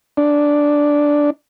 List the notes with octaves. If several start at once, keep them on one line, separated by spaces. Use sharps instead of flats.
D4